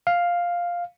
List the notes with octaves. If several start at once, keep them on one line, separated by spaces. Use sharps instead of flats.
F5